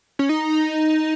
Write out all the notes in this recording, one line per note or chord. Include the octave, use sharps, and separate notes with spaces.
C#4
D#4